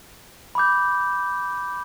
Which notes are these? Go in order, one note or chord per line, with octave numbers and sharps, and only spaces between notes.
B5 D6 G6